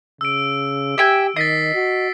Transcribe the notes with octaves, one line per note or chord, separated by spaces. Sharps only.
C#3 E6 D7
G4 E5 G5 G#5
D#3 D#5 A6 B6 C7
F#4